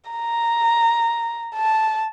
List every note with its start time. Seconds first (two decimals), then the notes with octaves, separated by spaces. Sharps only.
0.11 A#5
1.56 A5